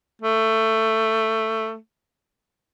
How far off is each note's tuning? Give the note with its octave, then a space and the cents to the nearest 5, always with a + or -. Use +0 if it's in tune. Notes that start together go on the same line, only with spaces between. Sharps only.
A3 +15